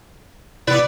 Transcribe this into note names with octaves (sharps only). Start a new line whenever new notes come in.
C3 B3 E4 B4 D5